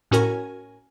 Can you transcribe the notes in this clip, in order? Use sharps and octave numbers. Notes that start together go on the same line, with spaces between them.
A2 C#4 F#4 A#4 G#5